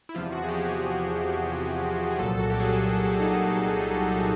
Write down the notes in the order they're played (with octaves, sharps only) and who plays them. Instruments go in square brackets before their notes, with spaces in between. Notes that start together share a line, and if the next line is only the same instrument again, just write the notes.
[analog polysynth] E4
E2 C3 F3 F4
F#4
G#4
G4
G#4
G#4
C2 A#2 F#3 A4
F#4
G4
G#4
A4
D#4